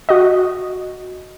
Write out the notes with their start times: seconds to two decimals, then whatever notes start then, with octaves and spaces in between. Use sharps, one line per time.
0.09 F#4 D#5